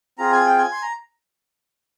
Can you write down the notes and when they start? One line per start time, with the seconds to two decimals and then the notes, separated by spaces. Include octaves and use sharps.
0.18 C4 F4 G#4 A#5
0.32 G#5
0.46 G5
0.58 G#5
0.72 C6
0.82 A#5